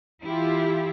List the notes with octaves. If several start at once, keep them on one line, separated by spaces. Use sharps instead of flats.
E3 E4 F4 G4